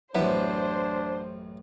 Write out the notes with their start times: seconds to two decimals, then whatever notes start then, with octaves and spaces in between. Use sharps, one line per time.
0.15 A1 F#2 B3 D4 E4 C5